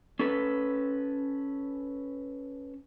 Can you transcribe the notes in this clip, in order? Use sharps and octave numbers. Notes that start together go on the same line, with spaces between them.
C#4 A4 B4